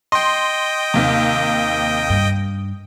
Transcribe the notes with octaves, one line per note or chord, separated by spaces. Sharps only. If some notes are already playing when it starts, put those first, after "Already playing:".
D#5 G5 C6
D#2 C3
G2